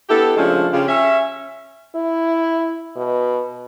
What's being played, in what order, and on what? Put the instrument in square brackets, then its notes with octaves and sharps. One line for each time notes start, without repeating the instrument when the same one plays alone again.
[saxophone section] B3 D4 E4 G4 A4
C#3 F3 G#3 A3 C#4 D4
C#3 F4 G4
C#4 E5
[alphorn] E4
B2